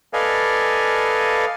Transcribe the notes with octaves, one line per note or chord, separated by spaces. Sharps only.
A4 B4 D5 D#5 F5 G#5